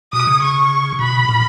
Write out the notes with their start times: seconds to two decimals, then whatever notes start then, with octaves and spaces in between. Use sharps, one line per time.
0.13 B2 D#6
0.27 C#3
0.42 C#6
0.99 B2 B5
1.29 A#2